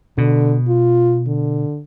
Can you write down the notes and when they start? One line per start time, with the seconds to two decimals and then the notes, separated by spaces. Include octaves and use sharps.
0.18 B2 D3
0.68 F4
1.27 D3